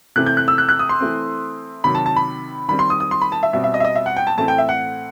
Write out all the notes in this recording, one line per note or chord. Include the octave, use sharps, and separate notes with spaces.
C3 E3 A3 C4 F#6
G6
F#6
E6
F#6
F#6
D#6
C6
E3 A3 C4
C3 D#3 F#3 B5
A5
A5
B5
D#3 G3 C4 B5
C6
D#6
D#6
C6
B5
A5
E5
B2 G3 C4 E5
E5
D#5
E5
D#5
E5
F#5
G5
A5
A2 E3 A3 C4 A5
G5
E5
F#5